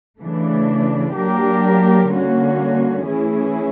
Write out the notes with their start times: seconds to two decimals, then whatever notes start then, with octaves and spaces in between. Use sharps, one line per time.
0.22 C#3 E3 A3 D4
1.16 F#3 A#3 D4 G4 A#4
2.11 D3 G3 A#3 C#4 F#4
3.04 E3 A3 C#4 E4 G#4